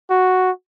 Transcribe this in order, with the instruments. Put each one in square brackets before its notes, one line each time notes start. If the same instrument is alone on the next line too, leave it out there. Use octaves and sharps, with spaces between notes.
[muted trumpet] F#4